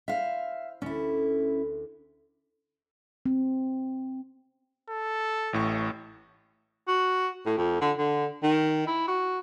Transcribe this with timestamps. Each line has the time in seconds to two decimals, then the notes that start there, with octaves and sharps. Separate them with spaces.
0.08 E4 C5 E5 F5 F6
0.82 D2 C#4 E4 A4
3.26 C4
4.90 A4
5.53 A1 A2 C#6
6.88 F#4
7.46 A2
7.57 F2
7.81 D3
7.98 D3
8.44 D#3
8.87 E4
9.08 F#4